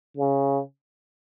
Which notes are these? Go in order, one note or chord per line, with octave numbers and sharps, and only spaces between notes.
C#3